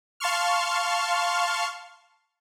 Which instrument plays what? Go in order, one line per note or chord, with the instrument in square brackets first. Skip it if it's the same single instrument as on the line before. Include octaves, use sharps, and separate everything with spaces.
[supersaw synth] F5 A5 C6 C#6 F6